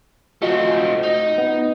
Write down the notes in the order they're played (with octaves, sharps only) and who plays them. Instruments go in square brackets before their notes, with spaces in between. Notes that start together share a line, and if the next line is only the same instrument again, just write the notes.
[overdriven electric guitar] A3 C4 [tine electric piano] F4 F#4 D#5
[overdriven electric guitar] D#4
[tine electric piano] B3